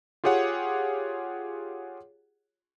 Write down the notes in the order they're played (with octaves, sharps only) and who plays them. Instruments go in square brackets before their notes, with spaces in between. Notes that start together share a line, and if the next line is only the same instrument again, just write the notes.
[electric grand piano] F4 G4 G#4 C#5 F#5